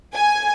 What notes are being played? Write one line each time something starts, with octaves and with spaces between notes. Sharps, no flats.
G#5